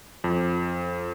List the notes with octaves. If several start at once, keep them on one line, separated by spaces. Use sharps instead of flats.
F2